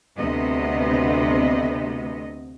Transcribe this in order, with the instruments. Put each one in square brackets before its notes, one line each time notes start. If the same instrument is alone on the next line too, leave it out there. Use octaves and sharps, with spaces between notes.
[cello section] D2 C3 B3 C4 D#5